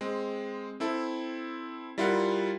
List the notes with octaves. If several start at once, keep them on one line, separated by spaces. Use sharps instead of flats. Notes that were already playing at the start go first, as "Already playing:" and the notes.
G#3 C4
C4 E4 A4
G3 E4 F4 A#4 F5 F#5